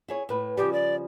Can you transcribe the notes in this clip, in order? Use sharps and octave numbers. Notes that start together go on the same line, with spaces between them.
E4 G#4 C#5
A2 B4
C#3 F3 G3 G4
D5